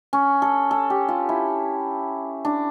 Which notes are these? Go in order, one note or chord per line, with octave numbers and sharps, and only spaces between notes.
C#4
A4
A4
G4
F4
E4
D4